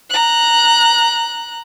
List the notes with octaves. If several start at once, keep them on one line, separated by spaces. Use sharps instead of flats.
A#5 F#6